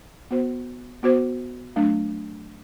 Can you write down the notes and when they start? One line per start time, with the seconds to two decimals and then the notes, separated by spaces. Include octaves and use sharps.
0.31 B3 F#4 C5
1.03 B3 F#4 C5
1.76 F#3 A3 D4